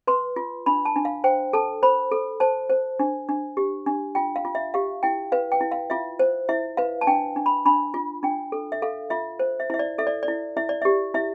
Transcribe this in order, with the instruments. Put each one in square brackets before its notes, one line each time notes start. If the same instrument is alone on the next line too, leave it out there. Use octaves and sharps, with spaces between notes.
[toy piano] B4 C6
F4
D4 B5
A5
D4
F5
C5 G5
A4 A5
C5 B5
A4
C5 A5
C5
D4
D4
G4
D4
F4 G5
F5
F4
E5
G4 F5
E4 G5
B4 F5
G5
E4
F5
F4 E5
C5
E4 E5
B4 F5
A5
D4 G5
D4
B5
D4 B5
F4
D4 G5
A4
E5
A4 F5
F4 E5
C5
E5
E4 E5
D5
A4 E5
D5
D5
E4
E4 E5
D5
G4 E5
E4 E5